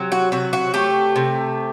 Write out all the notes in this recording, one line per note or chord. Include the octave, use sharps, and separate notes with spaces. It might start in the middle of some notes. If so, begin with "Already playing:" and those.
Already playing: C3 F#3
F#4
C3 F#4
F#4
A3 G4
C3